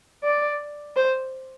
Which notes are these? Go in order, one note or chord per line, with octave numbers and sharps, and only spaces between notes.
D5
C5